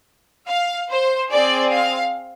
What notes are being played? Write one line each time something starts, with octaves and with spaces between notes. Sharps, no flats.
F5
C5
C4 G#4 D5
F5